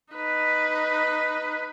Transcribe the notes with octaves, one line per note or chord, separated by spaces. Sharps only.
D#4 B4